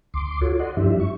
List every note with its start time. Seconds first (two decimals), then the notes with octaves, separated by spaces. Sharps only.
0.14 D2 C6 D6
0.41 F4 F#4 A4 C#5
0.59 D5 D#5 F#5 C6
0.77 G2 F3 D4 E4 G4 E5
1.00 C#6